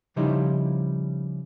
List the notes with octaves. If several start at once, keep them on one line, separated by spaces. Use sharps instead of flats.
C#3 F3 G3 D#4 E4 C5